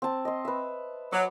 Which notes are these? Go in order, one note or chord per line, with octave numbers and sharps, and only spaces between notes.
C4 A5
D#5 C6
B4 E5
F#3 D6